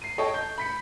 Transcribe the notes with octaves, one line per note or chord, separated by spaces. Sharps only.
C7 D#7
A4 C#5 D#5 G5 A5
G6
B5 B6 C#7